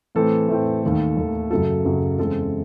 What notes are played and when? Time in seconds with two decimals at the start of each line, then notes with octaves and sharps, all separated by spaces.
0.15 A2 E3 A3 C4 A4
0.49 A2 E3 A3 C4
0.83 D#2 D#3 A3
1.17 D#2 D#3 A3
1.50 F#2 C#3 F#3 A4
1.85 F#2 C#3 F#3
2.19 E2 C#3 G#3 C4 A4